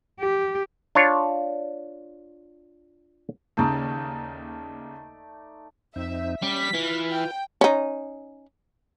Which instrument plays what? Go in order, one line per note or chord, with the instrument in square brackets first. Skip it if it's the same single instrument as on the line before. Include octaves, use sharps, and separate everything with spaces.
[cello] G4
[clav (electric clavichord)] D4 F4 C#5
[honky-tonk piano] D#2 C#3 [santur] A3 D#4 D5
[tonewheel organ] F2 C4 D#4 [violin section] E5
[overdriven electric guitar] G3 [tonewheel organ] C#4 [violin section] B6
[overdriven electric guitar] E3 [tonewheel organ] F4 B4 F6
[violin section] G5
[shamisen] C#4 D#4